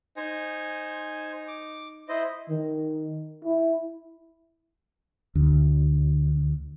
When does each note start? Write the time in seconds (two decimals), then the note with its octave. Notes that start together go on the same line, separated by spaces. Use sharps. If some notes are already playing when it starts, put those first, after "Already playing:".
0.17 D#4 C5 G#5
1.48 D6
2.09 E4 C5 D#5
2.49 D#3
3.45 E4
5.35 D2